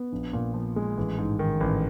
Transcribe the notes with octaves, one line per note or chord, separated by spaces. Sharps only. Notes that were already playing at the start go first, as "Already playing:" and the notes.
Already playing: B3
A#1
A#2
F3
G#3
A1
G#2
D#3
A1